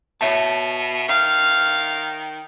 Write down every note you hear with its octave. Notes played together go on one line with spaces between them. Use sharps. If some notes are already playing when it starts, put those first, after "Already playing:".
B2 C#5 E5 A5
D#3 F5